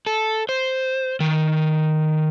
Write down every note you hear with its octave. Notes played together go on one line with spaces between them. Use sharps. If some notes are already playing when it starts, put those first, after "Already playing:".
A4
C5
D#3